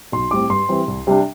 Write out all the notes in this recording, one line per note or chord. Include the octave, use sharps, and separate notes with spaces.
B1 C6
A2 G3 C4 D6
G2 C6
E3 G3 C4
C2
C3 G3 D4